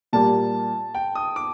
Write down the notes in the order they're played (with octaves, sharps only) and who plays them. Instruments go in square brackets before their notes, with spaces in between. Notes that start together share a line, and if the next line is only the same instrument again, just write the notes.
[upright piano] A#2 G3 A#3 [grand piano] A5
[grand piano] G5
D#6
D6